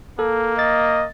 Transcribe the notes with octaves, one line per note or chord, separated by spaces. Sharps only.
A#3 A4
D#5 A6